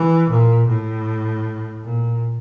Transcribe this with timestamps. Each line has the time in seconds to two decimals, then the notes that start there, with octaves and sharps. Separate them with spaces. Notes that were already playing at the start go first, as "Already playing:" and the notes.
Already playing: E3
0.29 A#2
0.67 A2
1.83 A#2